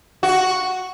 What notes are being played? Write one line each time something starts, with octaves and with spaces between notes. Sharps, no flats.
F#4